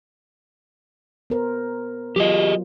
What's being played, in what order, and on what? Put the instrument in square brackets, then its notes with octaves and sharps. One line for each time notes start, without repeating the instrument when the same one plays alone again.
[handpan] B3 A#4 C5
[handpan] F#3 F4 [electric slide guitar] G4 G#4 D#5